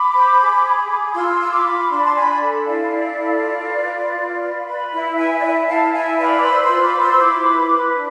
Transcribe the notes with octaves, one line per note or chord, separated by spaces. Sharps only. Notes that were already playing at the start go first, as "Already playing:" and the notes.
Already playing: B5 D6
C5
G#4
G#4
G#4
F4 C6 E6
F4 E6
B5 D6
F4
D4 C6
B5
A5 C6
D4 G#5 B5
A4
E4 D5 F5
E4
A4
F4
B4
F4
F4
B4
B4
E4 E5
B4 E5 G#5
D5
E4 E5
E4 F5 A5
E4 E5 G#5
B4 D5 F5
D6
C5 C6 E6
C6 E6
F4
B5 D6
C5
C6 E6
E4 B5 D6
B4
B4
D4